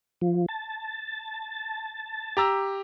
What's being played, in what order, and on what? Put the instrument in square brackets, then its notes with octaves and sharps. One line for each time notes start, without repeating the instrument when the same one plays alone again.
[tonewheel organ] F3
A5
[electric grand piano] G4 A#5 E6